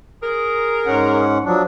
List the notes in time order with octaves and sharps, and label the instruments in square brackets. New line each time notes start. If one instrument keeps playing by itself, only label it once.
[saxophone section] G#4 A#4
[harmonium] G#2 C#4 F#5
F3 F#3 D4